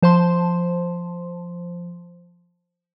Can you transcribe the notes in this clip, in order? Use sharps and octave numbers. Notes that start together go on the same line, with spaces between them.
F3 C5 A5 C6